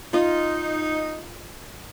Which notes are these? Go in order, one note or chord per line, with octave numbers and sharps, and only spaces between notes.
D#4 F4 D#5